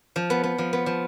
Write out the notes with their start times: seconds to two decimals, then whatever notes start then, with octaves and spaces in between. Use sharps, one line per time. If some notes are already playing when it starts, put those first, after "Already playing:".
0.16 F3
0.30 B3
0.44 B3
0.58 F3
0.73 B3
0.86 F3